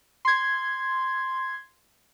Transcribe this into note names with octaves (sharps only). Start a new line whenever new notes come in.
C6 G#6